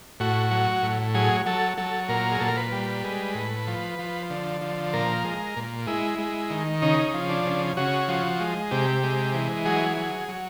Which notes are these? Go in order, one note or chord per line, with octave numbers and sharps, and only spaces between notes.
A2 F#4
F#3
A2
F#3 G#4
F#3 A4
F#3 A4
A#2 A#4
G#4
A#2 A4
A#4
B4
G3
G#3
A2
F3
F3
D3
F3
A#2 A#4
G#3
A#2
G#3 E4
G#3
D#3
C#3 D#4
F3
D4
C#3
C#3 F#4
F3
G#3
C3 G4
G#3
E3
F#3 G#4
F#3
F#3